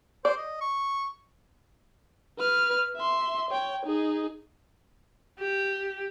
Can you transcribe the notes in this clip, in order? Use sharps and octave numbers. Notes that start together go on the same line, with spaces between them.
C5 D5
D#5
C#6
B4 F6
E5 C6
C#5 G5
D#4 G#4
G4